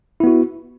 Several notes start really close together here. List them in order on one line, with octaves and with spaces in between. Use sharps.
E4 B3 F#4